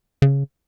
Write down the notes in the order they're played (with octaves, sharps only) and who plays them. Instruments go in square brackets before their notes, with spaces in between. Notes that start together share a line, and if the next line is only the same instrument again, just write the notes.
[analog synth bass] C#3